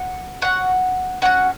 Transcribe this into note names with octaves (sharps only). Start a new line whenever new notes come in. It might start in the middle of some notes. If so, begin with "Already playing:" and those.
Already playing: F#5
C#4 F#4 F#5
C#4 F#4 F#5